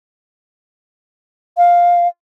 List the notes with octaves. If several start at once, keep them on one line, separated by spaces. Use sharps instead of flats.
F5